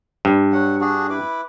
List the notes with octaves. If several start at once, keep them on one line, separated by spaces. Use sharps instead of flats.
G2
F#3 F#5
D4 F#4 G#4
E4 B4 D6